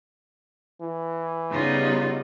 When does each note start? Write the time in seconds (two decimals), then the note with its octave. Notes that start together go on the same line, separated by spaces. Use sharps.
0.81 E3
1.50 C#3 G3 B3 D#4 F4